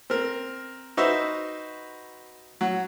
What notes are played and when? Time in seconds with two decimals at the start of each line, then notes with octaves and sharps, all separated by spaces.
0.10 C4 A#4
0.97 D#4 F#4 B4 C5 E5
2.61 F#3